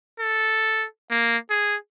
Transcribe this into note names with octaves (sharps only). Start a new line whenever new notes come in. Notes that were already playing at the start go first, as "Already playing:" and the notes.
A4
A#3
G#4